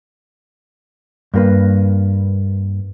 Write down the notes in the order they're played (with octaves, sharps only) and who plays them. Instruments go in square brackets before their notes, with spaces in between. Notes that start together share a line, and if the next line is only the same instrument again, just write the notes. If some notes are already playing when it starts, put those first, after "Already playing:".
[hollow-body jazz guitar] G2 A#3 B4